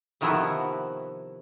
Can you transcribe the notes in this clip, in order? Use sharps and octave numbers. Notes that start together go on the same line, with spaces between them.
C3 D#3 F3 B3 E4 F#4